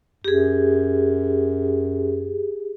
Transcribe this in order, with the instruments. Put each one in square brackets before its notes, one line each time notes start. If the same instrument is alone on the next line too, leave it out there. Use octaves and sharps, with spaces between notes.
[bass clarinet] F#2 [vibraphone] G4 G#4